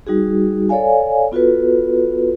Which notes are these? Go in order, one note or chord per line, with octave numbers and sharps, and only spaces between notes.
G3 D#4 F#4 G#4
A4 C#5 D5 F5 G#5
B3 F4 F#4 A4 B4